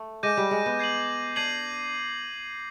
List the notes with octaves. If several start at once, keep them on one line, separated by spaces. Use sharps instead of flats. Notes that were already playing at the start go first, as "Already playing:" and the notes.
Already playing: A3
G#3 D6 G6 A#6 D#7
G3
G#3
B3
G#6 C7 D#7 F#7
D4 G#6 C7 D#7 F#7